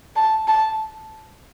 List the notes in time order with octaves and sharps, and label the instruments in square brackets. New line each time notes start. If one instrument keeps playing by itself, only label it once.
[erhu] A5
A5